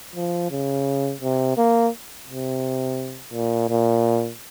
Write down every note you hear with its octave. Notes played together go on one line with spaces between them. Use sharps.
F3
C#3
C3
A#3
C3
A#2
A#2